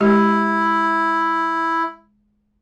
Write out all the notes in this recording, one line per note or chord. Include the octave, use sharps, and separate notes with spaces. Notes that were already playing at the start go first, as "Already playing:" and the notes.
G#3 E4 G4